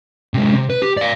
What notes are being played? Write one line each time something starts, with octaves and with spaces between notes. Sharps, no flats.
C3 G#3
C3
B4
G4
D5 F5